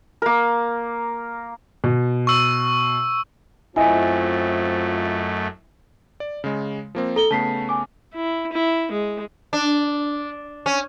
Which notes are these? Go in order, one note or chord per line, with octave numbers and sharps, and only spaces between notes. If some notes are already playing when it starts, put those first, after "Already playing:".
A#3 A#4
B2
C#6 E6
F#2 A3 C4 E4 F4 D#5 G#5
D5
C#3 G#3
F3 A#3 C4
A4 A#5 G7
C#3 A3 B3 A5 B6 C7
G#5 D6
E4
E4
G#3
D4
C#4